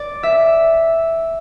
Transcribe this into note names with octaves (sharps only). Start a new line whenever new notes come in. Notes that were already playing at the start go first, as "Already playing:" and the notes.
Already playing: D5
E5